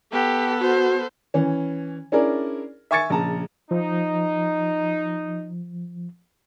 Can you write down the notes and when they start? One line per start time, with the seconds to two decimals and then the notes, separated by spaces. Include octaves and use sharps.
0.12 B3 G4 A4
0.61 F#4 C5
1.34 E3 C#4
2.12 C#4 D4 E4 G#4 A#4 D5
2.91 E5 G#5 C#6 G#6 A6 C#7
3.10 A#1 C#3 A5 A#5
3.71 F3 D#4